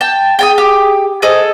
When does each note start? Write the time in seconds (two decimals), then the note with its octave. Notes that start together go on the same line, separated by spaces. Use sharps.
0.01 G5 A5
0.39 G#4 G5 A5 D#6
0.58 G4
1.22 G#4 A4 C5 D#5